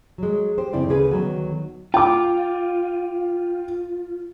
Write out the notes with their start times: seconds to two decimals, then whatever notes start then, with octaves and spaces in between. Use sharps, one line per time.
0.18 F#3 G#3
0.58 G4 C5
0.73 F2 C#3 C4 E4 D5
0.89 D2 C#3 G#4 B4
1.11 D2 D#3 F#3 B3
1.94 F4 G5 D6